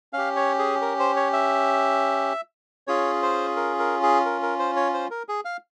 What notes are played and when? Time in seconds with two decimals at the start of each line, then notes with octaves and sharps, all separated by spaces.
0.13 C#4 G4 F5
0.36 C#5
0.59 G#4
0.82 A#4
1.00 C5
1.16 C#5
1.33 E5
2.87 C#4 F4 G#4 C#5
3.22 C5
3.56 A#4
3.79 A#4
4.03 G#4
4.26 A#4
4.42 A#4
4.59 C5
4.76 C#5
4.94 C5
5.11 A#4
5.28 G#4
5.45 F5